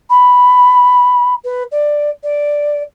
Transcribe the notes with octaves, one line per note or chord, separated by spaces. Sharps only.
B5
B4
D5
D5